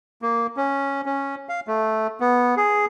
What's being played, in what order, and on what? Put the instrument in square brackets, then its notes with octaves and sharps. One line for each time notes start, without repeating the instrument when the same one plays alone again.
[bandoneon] A#3
C#4
C#4
F5
A3
B3
G#4